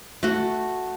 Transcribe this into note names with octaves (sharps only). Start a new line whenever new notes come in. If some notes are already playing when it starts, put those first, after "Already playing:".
A3 F#4